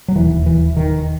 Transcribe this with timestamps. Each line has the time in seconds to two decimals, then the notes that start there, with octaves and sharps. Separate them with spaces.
0.08 F#3
0.15 E1 D#2 E3
0.46 E3
0.77 D#3